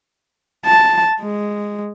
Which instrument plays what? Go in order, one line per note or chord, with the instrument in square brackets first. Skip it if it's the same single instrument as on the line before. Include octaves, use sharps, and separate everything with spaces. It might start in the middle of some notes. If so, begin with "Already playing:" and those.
[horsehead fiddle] A5
G#3